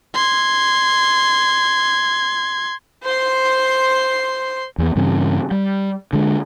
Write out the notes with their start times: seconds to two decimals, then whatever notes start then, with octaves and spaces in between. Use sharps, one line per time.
0.15 C6 G#6
3.04 C5 C6
4.78 E2 B3
4.96 G2 C#3 E3 C4
5.51 G3
6.13 D3 G#3